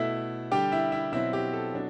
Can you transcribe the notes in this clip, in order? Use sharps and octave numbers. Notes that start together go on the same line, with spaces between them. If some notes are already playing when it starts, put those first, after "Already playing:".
Already playing: B2 A3 E4 E5
D3 G3 D4 G4 G5
E4 E5
E4 E5
B2 F#3 C4 E4 E5
G4
A4
B2 F#3 B3 D4